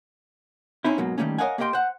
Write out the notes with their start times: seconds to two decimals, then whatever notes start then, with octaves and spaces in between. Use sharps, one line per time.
0.84 C4 C#4 D#4 E4
0.98 G#2 B2 F#3 A#3
1.18 D#3 E3 G3 A3 A#3 C#4
1.38 A#4 C#5 D#5 F5 F#5 G#5
1.58 A#3 G4 A#4 D#5 G5 C6
1.73 C5 F#5